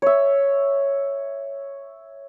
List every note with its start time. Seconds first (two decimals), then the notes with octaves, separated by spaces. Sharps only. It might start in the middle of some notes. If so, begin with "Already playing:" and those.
0.02 C#5 E5